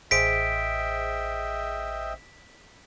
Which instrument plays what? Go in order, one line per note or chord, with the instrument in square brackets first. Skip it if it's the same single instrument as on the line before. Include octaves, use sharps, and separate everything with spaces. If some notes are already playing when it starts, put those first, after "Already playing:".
[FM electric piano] A1 G#4 C5 [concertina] D#5 E5 G5 [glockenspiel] B6 D7